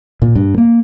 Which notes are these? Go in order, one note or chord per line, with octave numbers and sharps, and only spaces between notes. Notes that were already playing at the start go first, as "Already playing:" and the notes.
A#2
G2
A#3